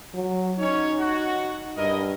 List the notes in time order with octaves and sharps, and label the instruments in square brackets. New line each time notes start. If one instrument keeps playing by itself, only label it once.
[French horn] F#3
[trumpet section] C#4 C#5 [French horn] D#4
[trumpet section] F#4
[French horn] G2 [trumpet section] E4 A#4 D#5